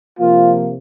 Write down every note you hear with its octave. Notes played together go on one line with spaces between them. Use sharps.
C3 F3 A#3 F4